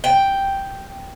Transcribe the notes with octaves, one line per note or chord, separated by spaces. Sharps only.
G5